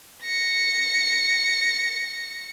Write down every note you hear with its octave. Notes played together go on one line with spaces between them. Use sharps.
A#6 C#7